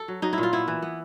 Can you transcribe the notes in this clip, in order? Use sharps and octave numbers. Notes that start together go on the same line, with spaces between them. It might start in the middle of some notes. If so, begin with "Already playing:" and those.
Already playing: A4
F#3
F#3 D#4
E4
A#2
F4
B3 E4
E3
B3